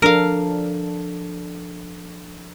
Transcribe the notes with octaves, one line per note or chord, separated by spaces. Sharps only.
F3 D4 A4 A#4 F5